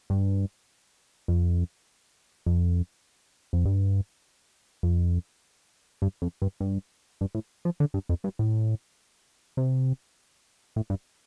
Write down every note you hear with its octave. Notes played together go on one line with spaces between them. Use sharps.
G2
F2
F2
F2
G2
F2
G2
F2
G2
G2
G2
A2
F3
D3
G2
F2
G2
A2
C3
A2
G2